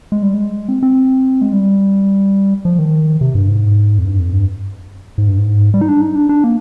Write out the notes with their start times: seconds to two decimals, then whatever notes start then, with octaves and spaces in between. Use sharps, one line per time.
0.12 G#3
0.23 G3
0.34 G#3
0.68 C4
0.83 C4
1.41 G#3
1.53 G3
2.65 F3
2.79 D#3
3.21 C3
3.35 G2
3.48 G#2
3.98 F2
4.05 G2
4.19 F2
4.33 G2
5.18 G#2
5.28 G2
5.38 G#2
5.74 G3
5.81 D#4
5.88 D4
6.01 D#4
6.15 D4
6.29 D4
6.44 A#3